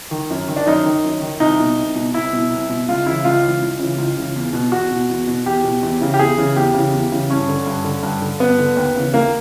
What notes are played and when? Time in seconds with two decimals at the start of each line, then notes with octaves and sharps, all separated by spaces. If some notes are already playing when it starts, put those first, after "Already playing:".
0.11 D#3
0.30 F#2
0.48 D#3
0.56 D4
0.66 F#2 D#4
0.86 D#3
1.04 F#2
1.22 D#3
1.40 C2 D#4
1.59 B2
1.78 C2
1.95 B2
2.14 C2 E4
2.33 B2
2.51 C2
2.69 B2
2.88 C#2 F4
3.06 C#3 E3 E4
3.24 C#2 F4
3.43 C#3 E3
3.62 C#2
3.79 C#3 E3
3.98 C#2
4.16 C#3 E3
4.36 E2
4.53 B2
4.72 E2 F#4
4.91 B2
5.09 E2
5.27 B2
5.46 E2 G4
5.64 B2
5.83 E2
6.00 C#3 E3
6.14 G4
6.19 E2 G#4
6.37 C#3 E3
6.56 E2 G4
6.74 C#3 E3
6.93 E2
7.12 C#3 E3
7.30 G2 C#4
7.49 D3
7.66 G2
7.84 D3
8.03 G2
8.21 D3
8.40 G2 B3
8.59 D3
8.77 D#2
8.95 C#3 E3
9.14 D#2 A#3